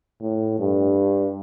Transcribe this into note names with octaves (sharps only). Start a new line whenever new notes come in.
A2
G2